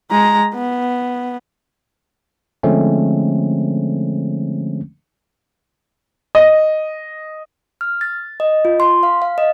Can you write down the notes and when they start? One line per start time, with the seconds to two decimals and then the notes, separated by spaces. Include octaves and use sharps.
0.11 G#3 A#5
0.54 B3
2.63 D3 F3 G#3 A3 C4 C#4
6.35 D#5
7.81 F6
8.01 A6
8.40 D#5
8.65 F4
8.80 C6
9.03 F5
9.22 F5
9.38 D#5